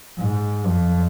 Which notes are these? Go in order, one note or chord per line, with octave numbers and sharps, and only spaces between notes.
G#2
F2